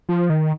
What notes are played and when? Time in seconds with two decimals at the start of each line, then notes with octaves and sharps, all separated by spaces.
0.09 F3
0.30 D#3